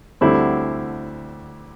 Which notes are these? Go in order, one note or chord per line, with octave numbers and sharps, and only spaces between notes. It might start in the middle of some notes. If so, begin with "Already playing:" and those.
D2 D3 G3 C4 E4